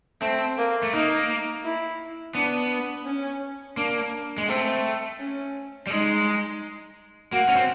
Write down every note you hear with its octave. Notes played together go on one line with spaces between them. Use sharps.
A3 C4
A#3
A3
A#3 D#4
E4
B3 D4
C#4
A#3 D4
G#3
A3 C4
C#4
G3
G#3 D#4
A#3 F#4
C#4
C4